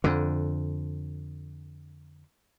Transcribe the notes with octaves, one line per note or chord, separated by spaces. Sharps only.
F2 D3